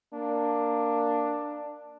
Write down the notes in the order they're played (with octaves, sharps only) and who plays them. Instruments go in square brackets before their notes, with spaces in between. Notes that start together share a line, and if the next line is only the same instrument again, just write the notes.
[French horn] A#3 [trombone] D4